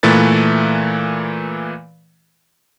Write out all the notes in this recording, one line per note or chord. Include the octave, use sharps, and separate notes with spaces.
A#2 E3 A3 B4 A6